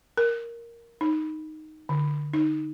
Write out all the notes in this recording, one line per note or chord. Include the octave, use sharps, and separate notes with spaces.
A#4
D#4
D3
D#4